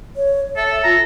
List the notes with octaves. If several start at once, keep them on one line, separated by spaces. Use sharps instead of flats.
C#5
A4 E5
F4 A#5